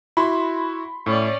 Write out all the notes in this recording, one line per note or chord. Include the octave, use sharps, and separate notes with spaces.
E4 F#4 B5 C6
A2 C#4 D5